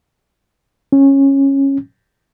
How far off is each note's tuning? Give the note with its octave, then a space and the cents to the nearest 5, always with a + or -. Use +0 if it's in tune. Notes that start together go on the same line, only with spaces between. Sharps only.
C#4 -15